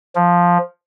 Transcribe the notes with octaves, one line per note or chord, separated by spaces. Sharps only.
F3